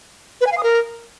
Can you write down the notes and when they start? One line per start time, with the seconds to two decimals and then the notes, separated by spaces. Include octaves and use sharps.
0.41 B4
0.46 G#5
0.52 F5
0.58 D#6
0.63 A#4